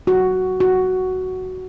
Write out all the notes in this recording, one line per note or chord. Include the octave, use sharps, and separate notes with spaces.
F#4
F#4